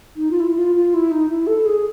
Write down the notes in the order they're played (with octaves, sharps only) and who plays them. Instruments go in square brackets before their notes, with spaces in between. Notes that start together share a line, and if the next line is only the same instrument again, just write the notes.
[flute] D#4
F4
E4
F4
F4
E4
D#4
E4
A4
G#4